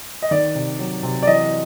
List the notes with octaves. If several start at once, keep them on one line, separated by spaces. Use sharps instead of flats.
D#5
D#3 D5
C3
F#3
C3
D5
E3 D#5